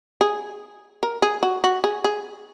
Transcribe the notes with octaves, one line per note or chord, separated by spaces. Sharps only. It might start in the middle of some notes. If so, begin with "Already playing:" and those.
G#4
A#4
G#4
F#4
F#4
G#4
G#4